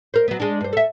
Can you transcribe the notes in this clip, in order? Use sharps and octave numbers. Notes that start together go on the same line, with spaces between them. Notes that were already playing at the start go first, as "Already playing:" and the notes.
A#4 C5
F#3 B3
G#3 D4
G2 C5
A4 E5